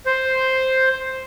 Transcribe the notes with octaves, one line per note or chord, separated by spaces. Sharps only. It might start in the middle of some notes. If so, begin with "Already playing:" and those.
C5